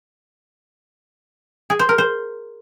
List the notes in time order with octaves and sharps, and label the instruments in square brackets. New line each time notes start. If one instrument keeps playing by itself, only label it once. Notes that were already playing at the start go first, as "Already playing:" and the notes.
[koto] G#4
C5
A#4
C5